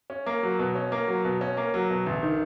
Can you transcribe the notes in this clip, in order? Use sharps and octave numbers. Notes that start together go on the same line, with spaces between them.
C#4
A#3
F#3
B2
C#4
A#3
F#3
B2
C#4
A#3
F#3
B2
A1
D#3